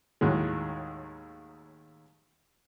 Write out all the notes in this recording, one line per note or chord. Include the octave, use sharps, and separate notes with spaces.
D#2 A2 F#3 G#3